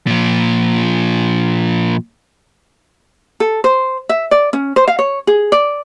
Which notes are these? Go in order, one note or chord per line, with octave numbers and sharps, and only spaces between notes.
A#2 F3
A4
C5
E5
D5
C#4
C5
F5
C#5
G#4
D5